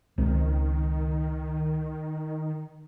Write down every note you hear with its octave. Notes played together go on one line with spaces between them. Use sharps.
C#2 D#3 C4